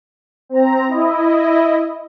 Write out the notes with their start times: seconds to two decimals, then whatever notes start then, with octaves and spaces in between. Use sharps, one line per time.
0.49 C4 A#5
0.88 E4 D#5